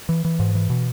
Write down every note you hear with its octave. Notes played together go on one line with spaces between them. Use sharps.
E3
E3
G#2
E3
B2